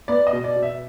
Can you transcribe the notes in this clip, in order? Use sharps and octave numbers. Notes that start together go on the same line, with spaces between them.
B3 D5
D#5
B2
D5
B2
E5